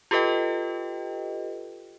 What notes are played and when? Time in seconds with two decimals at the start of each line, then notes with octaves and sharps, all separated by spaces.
0.11 F4 G4 A4 B4 D#5 G5